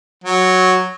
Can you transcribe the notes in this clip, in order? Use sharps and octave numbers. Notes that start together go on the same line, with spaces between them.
F#3